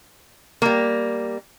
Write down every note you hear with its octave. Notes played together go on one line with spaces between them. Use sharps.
G3 A#3